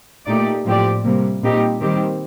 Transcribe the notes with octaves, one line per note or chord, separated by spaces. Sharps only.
A#2 A3 D#4 G4 D5
A2 F3 C4 G4 D5
C3 G3 A#3
A#2 G3 C4 D#4 G4
D#3 G3 C4 G4